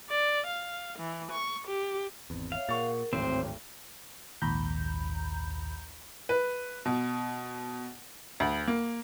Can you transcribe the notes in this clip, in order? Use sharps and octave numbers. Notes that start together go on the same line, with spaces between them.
D5
F5
E3
C#6
G4
G#1 E2 C4
C#5 E5 F5
A#2 G#4 A#4 F#5 C#6 A6
D1 G#1 A2 C4 C5 C#5
A#1 D#2 G#2 A#5 B5 G6
B4
B2
D2
A#3